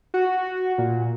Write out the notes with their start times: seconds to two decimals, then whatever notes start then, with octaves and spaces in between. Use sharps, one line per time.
0.14 F#4
0.78 A#2